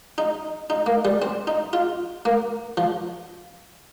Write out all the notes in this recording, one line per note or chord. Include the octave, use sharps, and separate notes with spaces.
D#4
D#4
A#3
G3
C4
D#4
F4
A#3
F3